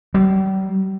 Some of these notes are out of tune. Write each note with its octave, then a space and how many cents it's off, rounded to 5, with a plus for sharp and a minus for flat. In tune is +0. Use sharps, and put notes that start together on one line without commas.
G3 -40